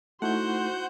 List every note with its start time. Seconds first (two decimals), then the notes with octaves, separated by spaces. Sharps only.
0.22 A3 D#4 E4 F#4 C5 F#5 G6